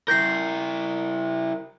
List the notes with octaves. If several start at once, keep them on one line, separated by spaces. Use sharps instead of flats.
E4 A#4 G6 A#6 C7